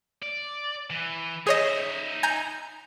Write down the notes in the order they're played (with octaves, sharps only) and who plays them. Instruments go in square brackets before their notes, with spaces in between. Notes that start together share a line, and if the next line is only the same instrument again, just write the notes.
[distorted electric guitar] D5
E3
[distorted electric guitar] D#4 E5 [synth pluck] G#4 C#5 D#5
[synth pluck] G#5 A#5 G6